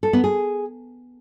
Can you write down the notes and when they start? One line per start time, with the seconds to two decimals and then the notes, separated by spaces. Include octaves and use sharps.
0.03 A4
0.13 B3
0.24 G#4